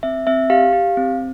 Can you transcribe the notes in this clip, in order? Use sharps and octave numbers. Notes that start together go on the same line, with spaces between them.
C4 E5
C4 E5
G4 F5
G4
C4